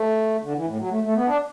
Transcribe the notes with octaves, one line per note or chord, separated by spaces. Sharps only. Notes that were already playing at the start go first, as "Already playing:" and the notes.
Already playing: A3
D3
E3
A2
F#3
A3
A3
B3
D4